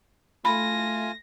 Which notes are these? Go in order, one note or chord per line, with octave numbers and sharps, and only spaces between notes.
A3 F4 G#5 B5 A#6